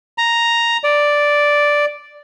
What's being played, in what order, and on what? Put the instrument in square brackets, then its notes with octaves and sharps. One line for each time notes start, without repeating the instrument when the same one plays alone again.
[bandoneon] A#5
D5